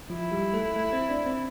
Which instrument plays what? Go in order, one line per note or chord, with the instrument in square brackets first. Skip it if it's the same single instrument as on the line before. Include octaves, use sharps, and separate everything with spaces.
[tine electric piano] F3 F4 [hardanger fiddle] E4
[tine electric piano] G3 G4
A3 A4
A3 A4
C4 C5
D4 D5
C4 C5